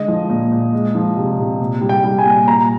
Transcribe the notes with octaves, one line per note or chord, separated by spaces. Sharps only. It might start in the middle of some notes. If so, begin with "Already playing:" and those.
Already playing: D3 G#3 D#5
F3
A#2
A#2
G#3
F3
C3
C3
A#2
G3
G5
G3
G#5
A#2
A#2 A#5